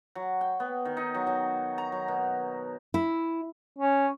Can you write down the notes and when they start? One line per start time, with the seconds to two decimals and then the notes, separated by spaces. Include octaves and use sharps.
0.15 F#3
0.41 G5
0.60 B3
0.85 D#3
0.97 D#4
1.15 F#3
1.27 F#3
1.78 A#5
1.92 F#3
2.08 B2
2.94 E4
3.78 C#4